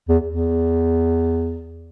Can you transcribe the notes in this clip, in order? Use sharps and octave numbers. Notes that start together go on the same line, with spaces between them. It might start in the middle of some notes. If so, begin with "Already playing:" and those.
E2
E2